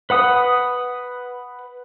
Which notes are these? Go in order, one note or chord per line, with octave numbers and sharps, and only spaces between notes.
B4 F#5 D#6